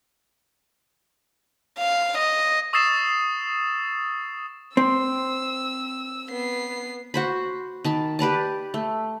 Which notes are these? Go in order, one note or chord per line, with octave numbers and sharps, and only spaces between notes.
F5
D#5
C#6 D#6 E6 A6 C7 E7
C4 E6
B3 C7
F#4 C5 B5
D#3 A5 B5
G4 B4 D5 A5
A3